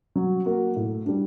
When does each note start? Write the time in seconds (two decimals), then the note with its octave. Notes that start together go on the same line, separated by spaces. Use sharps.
0.16 F#3
0.46 A#3 F#4
0.76 A2
1.06 G3 D4